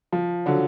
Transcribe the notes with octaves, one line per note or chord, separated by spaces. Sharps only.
F3
D3 F#3